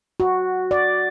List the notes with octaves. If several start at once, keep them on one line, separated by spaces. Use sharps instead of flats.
F#4
D5